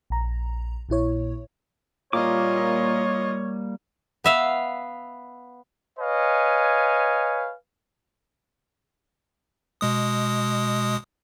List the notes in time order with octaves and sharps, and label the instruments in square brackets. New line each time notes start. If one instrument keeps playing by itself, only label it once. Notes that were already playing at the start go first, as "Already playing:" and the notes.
[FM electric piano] A#1 A#5
A#1 A#2 E4 C#5
[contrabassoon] A#2 [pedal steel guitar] G3 A#3 D6 [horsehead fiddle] F4 D#5 [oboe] C#5
[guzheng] B3 E5 F5
[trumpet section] B4 C#5 D#5 F5 G#5
[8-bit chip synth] B2 G#3 D#6